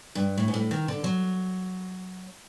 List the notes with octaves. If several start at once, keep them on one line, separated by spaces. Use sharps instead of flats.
G2
A2
G#2
A2
D#3
D3
F#3